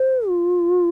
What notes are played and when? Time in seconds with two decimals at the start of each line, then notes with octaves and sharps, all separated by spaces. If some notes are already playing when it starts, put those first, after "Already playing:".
Already playing: C5
0.28 F4